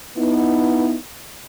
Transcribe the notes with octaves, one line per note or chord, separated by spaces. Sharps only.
B3 D#4 E4